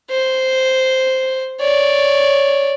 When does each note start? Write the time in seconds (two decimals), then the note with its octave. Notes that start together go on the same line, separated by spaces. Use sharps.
0.11 C5
1.60 C#5 D5